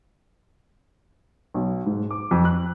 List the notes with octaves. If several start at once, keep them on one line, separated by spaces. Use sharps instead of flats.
B1
G#2
D6
F2
F#6